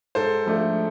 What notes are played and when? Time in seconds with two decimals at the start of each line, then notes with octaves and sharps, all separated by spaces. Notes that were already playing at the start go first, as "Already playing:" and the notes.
0.15 G#2 A4 C5
0.46 F3 A3 D4